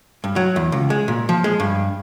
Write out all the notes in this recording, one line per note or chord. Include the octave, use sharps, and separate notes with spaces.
G2
F#3
E2
C#2
G#3
A#2
F3
G#3
G2